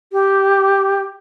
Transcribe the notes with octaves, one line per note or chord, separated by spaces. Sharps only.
G4